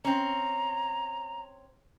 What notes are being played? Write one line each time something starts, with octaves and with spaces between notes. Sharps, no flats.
C4 C#4 A#5